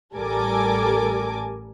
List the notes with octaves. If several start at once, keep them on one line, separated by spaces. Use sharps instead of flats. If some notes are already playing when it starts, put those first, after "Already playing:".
A1 G3 A4 A#4 G#5 D6